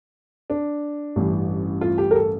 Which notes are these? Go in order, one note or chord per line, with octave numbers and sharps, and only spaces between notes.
D4
A1 G2 E3
F4
G4
A#4
A4